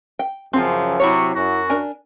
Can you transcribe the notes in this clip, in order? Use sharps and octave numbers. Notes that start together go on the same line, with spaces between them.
G5
F#2 C#3 F3 C4
C3 F#3 E4 C#5 C#6
F#2 F#4
D4 A#4 G#5